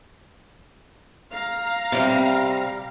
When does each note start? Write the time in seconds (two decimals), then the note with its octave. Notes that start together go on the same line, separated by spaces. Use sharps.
1.33 F5 A#5
1.92 C3 G3